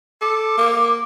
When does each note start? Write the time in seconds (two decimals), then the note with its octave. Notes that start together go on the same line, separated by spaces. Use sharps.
0.22 A4 D6
0.58 A#3